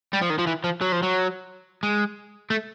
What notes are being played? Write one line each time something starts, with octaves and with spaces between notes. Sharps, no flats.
G3
F3
D#3
F3
E3
F3
F#3
F3
F#3
G#3
A3